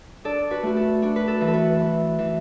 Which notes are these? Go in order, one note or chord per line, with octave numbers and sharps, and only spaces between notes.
D4 A4 D5
F#4 B4
A3 F#4
A4
D4 F#4
B4
A4
E3
A4
F#4 B4
E3
E3